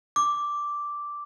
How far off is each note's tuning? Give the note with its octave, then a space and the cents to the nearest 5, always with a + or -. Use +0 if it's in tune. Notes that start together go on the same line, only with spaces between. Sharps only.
D6 -5